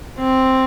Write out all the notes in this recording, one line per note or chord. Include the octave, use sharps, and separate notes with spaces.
C4